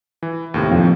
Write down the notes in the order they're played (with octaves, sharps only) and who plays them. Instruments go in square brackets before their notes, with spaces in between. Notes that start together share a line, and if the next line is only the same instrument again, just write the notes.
[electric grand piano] E3
D#2 A2 C3
[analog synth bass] F2